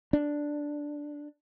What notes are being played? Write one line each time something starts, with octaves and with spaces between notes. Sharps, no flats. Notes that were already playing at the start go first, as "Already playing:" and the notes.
D4